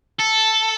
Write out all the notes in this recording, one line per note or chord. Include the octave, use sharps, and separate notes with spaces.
A4